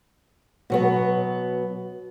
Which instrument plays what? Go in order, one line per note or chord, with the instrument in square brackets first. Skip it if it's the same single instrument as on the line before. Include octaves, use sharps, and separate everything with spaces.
[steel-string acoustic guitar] B2 F#3 B3